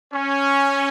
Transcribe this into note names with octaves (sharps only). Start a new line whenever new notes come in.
C#4